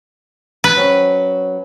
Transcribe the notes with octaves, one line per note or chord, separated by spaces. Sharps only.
B4
F#3 C4 C#4